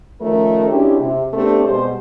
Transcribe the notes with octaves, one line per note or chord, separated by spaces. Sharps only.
D#3 F3 A3 C#4 A#4
G#3 C#4 D4 E4 F#4 G4
C3
A3 B3 C4 D4 G4 A4
B2 G3 G#3 C5